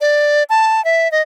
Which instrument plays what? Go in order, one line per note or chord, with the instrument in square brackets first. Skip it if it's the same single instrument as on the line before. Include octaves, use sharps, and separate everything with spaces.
[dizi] D5
A5
E5
D#5